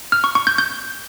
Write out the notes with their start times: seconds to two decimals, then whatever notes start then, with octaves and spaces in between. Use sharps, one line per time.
0.12 F6
0.24 C#6
0.35 C#6
0.47 G6
0.58 G6